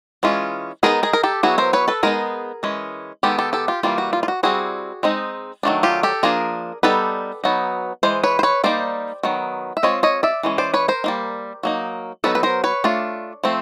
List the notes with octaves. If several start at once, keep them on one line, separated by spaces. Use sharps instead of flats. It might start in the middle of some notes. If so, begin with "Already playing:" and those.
E3 G#3 C#4 F4
G#3 B3 D#4 G#4 A#4
G#4 A#4
A#4
G4 A4
F#3 B3 E4 F#4 G#4
A#4 C5
B4 C#5
A4 B4
G#3 B3 D#4 G#4 A#4
E3 G#3 C#4
D#3 G#3 B3 G4 A4
G4 A4
G4 A4
F4 G4
E3 G3 A#3 F4
F#4
F4
F4
F#4
G3 C4 E4 F#4 G#4
G#3 C4 D#4
D#3 F#3 A3 D4
F4 G4
G4 A4
F3 A#3 D4 G#4 A#4
G3 B3 D#4 A4 B4
F#3 B3 D#4
E3 G#3 C5
B4 C#5
C5
B4 C#5
G3 A#3 D#4 C5 D5
D#3 F#3 B3
E5
G#3 C4 F4 C#5 D#5
C#5 D#5
D5 E5
E3 G#3 C#4
C5 D5
B4 C#5
A#4 C5
G3 A#3 D#4
F#3 A#3 D#4
F#3 B3 D#4 A4 B4
B4
A#4 C5
B4 C#5
A3 D4 F4
F3 A3 C4